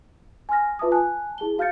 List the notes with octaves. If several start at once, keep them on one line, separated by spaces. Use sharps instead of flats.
G#5 C6 F6 A#6
F4 B4 E5 A5 D6 D#6
G#5 A5 F#6
E4 G#4 A5 G7
F#4 F5 F6 G6 A6 C#7